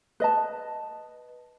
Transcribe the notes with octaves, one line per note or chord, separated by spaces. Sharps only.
B4 D#5 A5